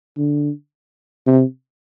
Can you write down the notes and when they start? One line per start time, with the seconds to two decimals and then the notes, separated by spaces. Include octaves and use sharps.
0.17 D3
1.27 C3